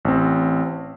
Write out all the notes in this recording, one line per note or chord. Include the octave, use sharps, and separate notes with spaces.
A1 C4